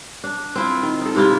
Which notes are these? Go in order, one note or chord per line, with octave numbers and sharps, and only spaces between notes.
D4
C4 E4 F4
D#3
D#4 A4
G#2 C3 E4 F4